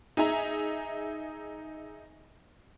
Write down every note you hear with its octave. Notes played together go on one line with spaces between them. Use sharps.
D#4 G#4 E5 A#5